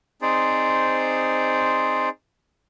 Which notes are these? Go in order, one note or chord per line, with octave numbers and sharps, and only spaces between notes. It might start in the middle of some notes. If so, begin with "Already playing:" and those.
C4 D#4 G#4 C5 D5